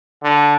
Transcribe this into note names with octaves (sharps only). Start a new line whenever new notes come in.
D3